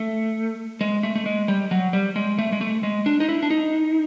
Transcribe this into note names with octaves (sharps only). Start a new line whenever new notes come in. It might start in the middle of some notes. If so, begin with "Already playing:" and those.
Already playing: A3
G#3
A3
A3
G#3
G3
F#3
G3
G#3
A3
G#3
A3
G#3
D4
D#4
E4
D4
D#4